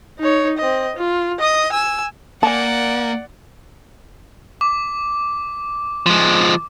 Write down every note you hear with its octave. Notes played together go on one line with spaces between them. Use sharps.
D#4 C#5
C4 D#5
F4
D#5 D#6
G#5 E6
A#3 D5 F#5 G#5 A5
D6
F3 G#3